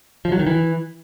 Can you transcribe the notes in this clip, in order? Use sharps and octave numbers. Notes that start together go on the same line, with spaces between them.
F3
F#3
D#3
E3